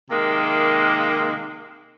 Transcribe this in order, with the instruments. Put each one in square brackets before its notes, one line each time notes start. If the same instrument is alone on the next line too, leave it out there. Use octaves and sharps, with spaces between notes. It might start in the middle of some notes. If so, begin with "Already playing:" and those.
[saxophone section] C3 D#3 G#3 A#3